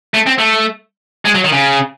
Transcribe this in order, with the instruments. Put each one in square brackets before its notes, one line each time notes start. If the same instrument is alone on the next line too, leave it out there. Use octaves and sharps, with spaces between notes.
[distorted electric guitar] A3
C4
A3
G#3
F#3
D#3
C#3